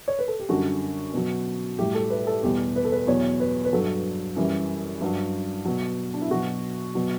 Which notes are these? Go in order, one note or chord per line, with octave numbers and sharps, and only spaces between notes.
C#5
B4
A4
G4
F#2 D3 G3 F#4
B2 F#3
A2 G3 G4
A4
B4
A4
E2 B2 G3 G4
B4
A4
B4
E2 B2 F#3 C#5
B4
B4
G2 F#3 A4
F#2 E3 G3
G2 F#3
B2 F#3
D4
E4
B2 F#3 F#4
B2 F#3